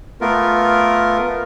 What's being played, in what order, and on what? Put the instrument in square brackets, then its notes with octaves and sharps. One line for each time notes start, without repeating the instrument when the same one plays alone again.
[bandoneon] A3 B3 F4 A#4